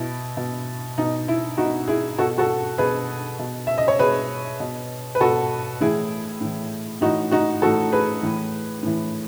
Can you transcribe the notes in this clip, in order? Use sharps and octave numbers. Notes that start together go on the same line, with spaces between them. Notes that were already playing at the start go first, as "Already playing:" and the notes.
Already playing: B2 E4
B2
B2 D#4
E4
B2 D#4 F#4
E4 G#4
B2 F#4 A4
F#4 A4
B2 G#4 B4
B2
E5
D#5
C#5
B2 G#4 B4
B2
B4
B2 F#4 A4
A2 E3 E4 G#4
A2 E3
A2 E3 D#4 F#4
D#4 F#4
A2 E3 F#4 A4
G#4 B4
A2 E3
A2 E3